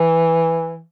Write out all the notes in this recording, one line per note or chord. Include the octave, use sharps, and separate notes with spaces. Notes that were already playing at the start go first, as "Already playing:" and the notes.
Already playing: E3